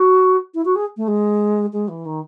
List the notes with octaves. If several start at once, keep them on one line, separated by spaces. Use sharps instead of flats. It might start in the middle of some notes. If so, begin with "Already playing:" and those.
Already playing: F#4
E4
F#4
G#4
A3
G#3
G#3
E3
D#3